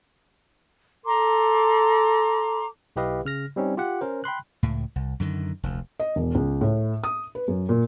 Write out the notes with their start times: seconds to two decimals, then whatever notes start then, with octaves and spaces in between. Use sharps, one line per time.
1.06 A4 A#5 C6 D6
2.96 B1 E4 G4 B4 D#5 F5
3.25 C#3 F6 A#6
3.56 G3 C4 C#4 D#4
3.77 F4 G4 F#5
4.01 C#4 A#4 C5
4.24 G5 B5 C6 F#6
4.63 C#2 A2
4.96 C2
5.20 F#2 D3 D#3
5.63 F1 D2
6.00 D#5
6.16 E1
6.35 C#2
6.61 A2
7.04 D#6
7.35 B4
7.48 F#2
7.69 A#2